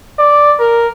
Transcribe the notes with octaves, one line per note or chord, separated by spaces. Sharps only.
D5
A#4